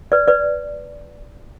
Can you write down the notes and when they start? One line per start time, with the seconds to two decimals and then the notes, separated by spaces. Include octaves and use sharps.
0.12 B4 D5
0.28 B4 D5